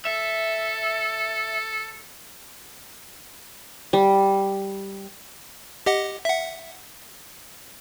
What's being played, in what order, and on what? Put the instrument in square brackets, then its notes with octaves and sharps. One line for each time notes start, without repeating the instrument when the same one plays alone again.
[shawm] A4 [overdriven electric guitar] E5
[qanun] G3
[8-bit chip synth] G4 D#5 F#5
E5 F#5